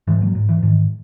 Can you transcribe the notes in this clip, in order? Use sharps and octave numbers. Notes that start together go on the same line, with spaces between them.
G#2 E3 G#3
F#3 A#3
G#2
E3
G#2 D#3